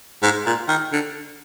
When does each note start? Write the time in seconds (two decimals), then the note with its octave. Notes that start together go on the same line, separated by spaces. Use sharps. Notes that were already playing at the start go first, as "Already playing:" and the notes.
0.23 G#2
0.46 A#2
0.68 D#3
0.92 D3